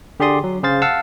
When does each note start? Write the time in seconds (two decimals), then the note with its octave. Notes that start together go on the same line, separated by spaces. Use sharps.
0.20 D3 G4 G#4 D5 C6 D#6
0.44 F#3
0.63 C#3 G#4 C5 F5 A6
0.82 F5 F#5 A5 E6